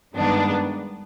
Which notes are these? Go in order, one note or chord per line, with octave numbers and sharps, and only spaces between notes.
G2 D#3 G#3 B3 D4